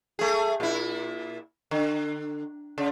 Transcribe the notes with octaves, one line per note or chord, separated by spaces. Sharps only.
A3 G#4
A#2 E4
D3
C#3